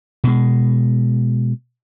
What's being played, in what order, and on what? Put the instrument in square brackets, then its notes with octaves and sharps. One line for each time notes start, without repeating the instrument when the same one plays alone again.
[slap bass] B2 G#3